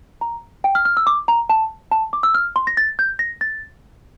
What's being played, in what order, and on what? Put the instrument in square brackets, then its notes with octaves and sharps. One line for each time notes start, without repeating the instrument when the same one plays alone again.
[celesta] A#5
G5
F6
F6
E6
D6
A#5
A5
A5
D6
E6
F6
C6
A#6
A6
G6
A#6
A6